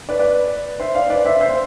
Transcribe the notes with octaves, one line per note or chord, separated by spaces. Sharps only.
B4 D5
B4 D5
C5 E5
D5 F5
B4 D5
C5 E5
C5 E5